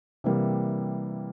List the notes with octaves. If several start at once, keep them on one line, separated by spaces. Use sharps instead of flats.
C3 E3 G3 A#3